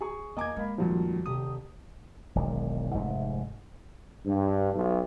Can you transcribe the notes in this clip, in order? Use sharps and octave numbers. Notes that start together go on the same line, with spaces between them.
G#4 C#6
E2 A#3 D#5 G#5 D6 G#6
G#3 A#3 A#4 F5 B5
F2 A#2 D#3 F3 G3 F#4
D#1 C3 G4 D#6
E1 B1 G#2 D#3
F1 G#2 C3 A3
G2
B1